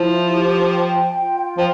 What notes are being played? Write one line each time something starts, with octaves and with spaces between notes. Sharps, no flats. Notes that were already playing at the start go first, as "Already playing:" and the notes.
Already playing: F3 E4
G4
G5
F4
F3